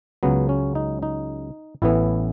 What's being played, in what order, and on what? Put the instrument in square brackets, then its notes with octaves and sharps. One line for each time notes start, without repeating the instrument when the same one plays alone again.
[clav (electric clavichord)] C#2 C#3 F#3 B3
C#4
D#4
D#4
A1 A2 E3 B3 E4